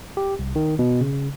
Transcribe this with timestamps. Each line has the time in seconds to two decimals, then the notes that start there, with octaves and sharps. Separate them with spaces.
0.17 G4
0.39 C2
0.56 D#3
0.79 B2
1.01 C#3